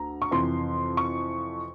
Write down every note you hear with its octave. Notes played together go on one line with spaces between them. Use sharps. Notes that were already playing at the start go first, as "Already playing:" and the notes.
Already playing: D2 A#5
C#6
F2 C3 E3 C6
C#6